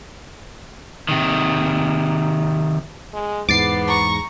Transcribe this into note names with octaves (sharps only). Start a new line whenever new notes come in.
C3 D#3
G#3
E2 G#2 B3 D6 A6 C7
A#5 C#6